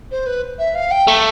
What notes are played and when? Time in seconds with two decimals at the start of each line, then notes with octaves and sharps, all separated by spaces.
0.11 C5
0.26 B4
0.59 E5
0.75 F5
0.91 G5
1.07 A3